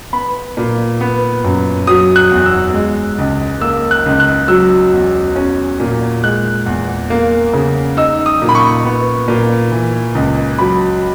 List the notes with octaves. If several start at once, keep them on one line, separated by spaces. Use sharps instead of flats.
B3 B5
A#2
B3
F#2
F#3 D#6
F#6
E2
E6
G#3
C#2
A#3 E6
F#6
C#2
F#6
F#3 E6
E2
C#4
A#2
G#3 F#6
E2
A#3
C#3
D#4 E6
D#6
A#2
B5
C#6
B3
A#2
E3
C#2
F#3 B5